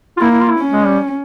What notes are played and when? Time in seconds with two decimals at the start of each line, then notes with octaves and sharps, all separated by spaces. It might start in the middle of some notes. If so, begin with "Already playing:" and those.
0.17 F4
0.21 A#3 E4
0.31 E4
0.40 F4
0.50 E4
0.59 C#4
0.72 G#3
0.85 G3